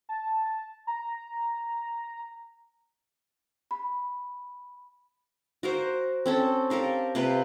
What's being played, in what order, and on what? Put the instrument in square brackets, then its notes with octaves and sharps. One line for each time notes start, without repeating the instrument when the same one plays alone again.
[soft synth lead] A5
A#5
[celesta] B5
[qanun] F#4 A#4 C5
C4 C#4 A4
G4 A4 A#4 F5
C3 F4 G4 B4